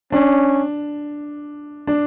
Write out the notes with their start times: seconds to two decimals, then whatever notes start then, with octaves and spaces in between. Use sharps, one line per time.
0.12 C#4 D4
1.87 D4